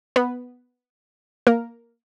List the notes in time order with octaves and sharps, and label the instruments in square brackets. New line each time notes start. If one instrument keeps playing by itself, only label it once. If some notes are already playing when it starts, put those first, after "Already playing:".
[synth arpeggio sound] B3 B4
A#3 A#4